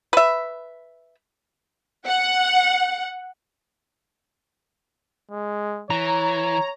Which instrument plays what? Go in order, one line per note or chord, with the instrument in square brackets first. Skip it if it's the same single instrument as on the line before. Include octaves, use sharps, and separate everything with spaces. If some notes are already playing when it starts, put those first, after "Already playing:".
[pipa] B4 E5
[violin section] F#5
[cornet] G#3
[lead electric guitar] E3 [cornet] C#5 [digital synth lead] A#5